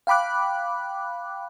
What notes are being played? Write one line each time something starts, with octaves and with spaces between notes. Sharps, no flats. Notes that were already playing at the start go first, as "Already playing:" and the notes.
F5 G5 B5 D6 F#6